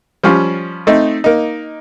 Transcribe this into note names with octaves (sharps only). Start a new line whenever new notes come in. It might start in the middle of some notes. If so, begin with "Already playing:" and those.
F3 G3 C#4 F4
A3 C4 D#4
A#3 D#4